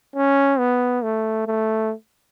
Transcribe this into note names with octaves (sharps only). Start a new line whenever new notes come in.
C#4
B3
A3
A3